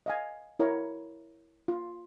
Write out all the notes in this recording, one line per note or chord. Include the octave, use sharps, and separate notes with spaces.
D#5 F5 G#5
E4 A#4 C#5 A#5
F4